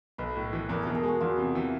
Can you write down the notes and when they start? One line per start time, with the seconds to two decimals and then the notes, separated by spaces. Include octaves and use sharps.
0.18 B1 B4
0.36 A2
0.53 E3
0.69 E2 A#4
0.83 B2 A4
0.95 G#4
1.03 G#3 F#4
1.21 E2 F4
1.38 C3
1.55 E3